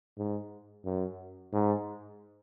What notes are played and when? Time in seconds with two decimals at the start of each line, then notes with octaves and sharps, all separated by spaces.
0.18 G#2
0.85 F#2
1.53 G#2